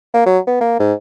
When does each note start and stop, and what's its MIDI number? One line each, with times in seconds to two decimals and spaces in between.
0.14 0.21 58
0.26 0.39 54
0.47 0.58 59
0.61 0.79 58
0.80 0.93 44